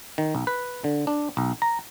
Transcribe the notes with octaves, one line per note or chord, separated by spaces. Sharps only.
D#3
B1
B4
D3
D4
B1
A#5